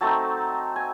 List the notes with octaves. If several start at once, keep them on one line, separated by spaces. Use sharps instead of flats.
F#3 A3 C4 D#4 A5
G#5